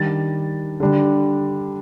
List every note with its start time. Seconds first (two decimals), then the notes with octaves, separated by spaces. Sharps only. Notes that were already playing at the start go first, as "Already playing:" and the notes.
Already playing: D#3 G3 D4 A6
0.80 D3 G3 D4